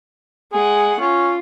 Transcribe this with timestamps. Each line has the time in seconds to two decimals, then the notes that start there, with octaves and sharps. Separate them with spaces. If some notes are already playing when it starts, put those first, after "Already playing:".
0.52 G#3 G#4 F#5
1.00 C#4 F4